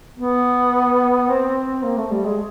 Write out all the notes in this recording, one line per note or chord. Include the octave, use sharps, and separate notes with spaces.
B3
C4
A#3
A3
G3
G#3